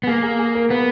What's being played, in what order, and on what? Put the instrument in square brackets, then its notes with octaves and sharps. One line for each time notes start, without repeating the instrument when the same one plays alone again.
[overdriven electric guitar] B3
[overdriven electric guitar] A#3 [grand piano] G#4
[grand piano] G#4
G#4
A#4
[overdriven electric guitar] B3 [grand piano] B4